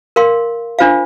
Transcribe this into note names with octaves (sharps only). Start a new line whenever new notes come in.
A#4 F5 C6
D4 F4 C5 F5